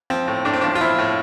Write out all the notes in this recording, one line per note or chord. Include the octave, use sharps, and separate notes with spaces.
F3 C4
A2
A2 D4
C4
F3 D4
F4
F3 E4
A2